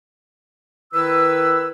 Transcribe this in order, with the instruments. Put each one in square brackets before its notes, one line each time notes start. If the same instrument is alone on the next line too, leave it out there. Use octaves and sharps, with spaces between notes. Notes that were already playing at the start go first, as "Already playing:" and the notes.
[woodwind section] D#3 E4 B4 E6